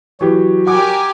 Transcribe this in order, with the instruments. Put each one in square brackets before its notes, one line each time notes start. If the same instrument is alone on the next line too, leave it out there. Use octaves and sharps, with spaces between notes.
[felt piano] E3 G4 [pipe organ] F#3 F#4
[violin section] G4 A#4 G#5 [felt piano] F#5 D6